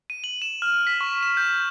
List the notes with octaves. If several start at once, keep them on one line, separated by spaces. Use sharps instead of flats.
D#7
F#7
E7
F6
B6
C#6
E7
G6